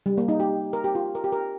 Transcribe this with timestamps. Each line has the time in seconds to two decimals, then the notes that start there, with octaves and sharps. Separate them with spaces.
0.06 G3
0.18 A#3
0.28 D#4
0.40 G4
0.73 A#4
0.84 G4
0.95 F4
1.15 A#4
1.24 G4
1.32 A#4